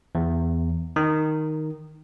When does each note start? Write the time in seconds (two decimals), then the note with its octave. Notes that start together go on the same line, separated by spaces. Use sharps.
0.15 E2
0.96 D#3